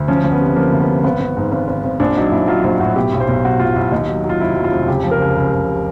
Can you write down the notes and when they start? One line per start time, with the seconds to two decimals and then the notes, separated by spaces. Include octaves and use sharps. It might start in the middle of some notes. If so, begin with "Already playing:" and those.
Already playing: D2
0.08 F3 C#4
0.24 D2
0.32 B3
0.41 C3
0.56 F3 A#3
0.72 D2
0.80 B3
0.89 C3
1.04 G#1 B3
1.20 G#1
1.37 G#2
1.52 G#1
1.68 G#1
1.84 G#1
2.00 A#1 D4
2.17 F#3 D#4
2.32 A#1 E4
2.48 F#3 F4
2.64 A#1 F4
2.80 A2 F#4
2.96 B2 G4
3.12 B1
3.20 C5
3.28 B1
3.45 B1 F#4
3.60 B1 F4
3.76 B1 E4
3.91 D#2 D#4
4.09 F#3
4.24 F#3
4.29 F4
4.40 F1 E4
4.56 F#3
4.64 F4
4.71 F1
4.87 C#2 G4
5.03 F3
5.11 A#4
5.21 C#2
5.36 C#2
5.53 C#2